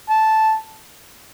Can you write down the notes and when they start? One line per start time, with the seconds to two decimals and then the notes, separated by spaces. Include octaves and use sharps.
0.10 A5